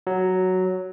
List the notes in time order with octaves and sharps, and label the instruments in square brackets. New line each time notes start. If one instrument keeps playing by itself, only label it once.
[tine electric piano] F#3